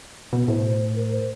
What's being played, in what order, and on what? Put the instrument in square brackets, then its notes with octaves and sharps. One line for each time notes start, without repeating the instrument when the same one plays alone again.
[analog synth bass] B2
[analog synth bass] A2 [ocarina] C5
[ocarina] A#4
C5